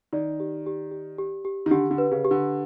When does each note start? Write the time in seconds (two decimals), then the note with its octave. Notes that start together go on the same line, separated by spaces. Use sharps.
0.13 D#3 D5
0.40 G4
0.66 G4
0.92 G4
1.18 G4
1.45 G4
1.66 D#3
1.71 D3 G4
1.91 D3
1.98 B4
2.11 C#3
2.25 G4
2.31 D3